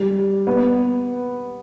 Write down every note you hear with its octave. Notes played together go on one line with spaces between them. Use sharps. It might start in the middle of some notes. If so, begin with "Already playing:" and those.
Already playing: G3
B3